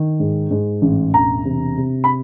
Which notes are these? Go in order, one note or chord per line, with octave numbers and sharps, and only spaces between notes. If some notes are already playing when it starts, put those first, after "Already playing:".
Already playing: D#3
G#2
G#2
A1
E1 A#5
C3
C3
B5